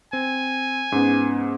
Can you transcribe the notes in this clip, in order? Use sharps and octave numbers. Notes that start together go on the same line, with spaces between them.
C4 G#5
G#2 B3 C#4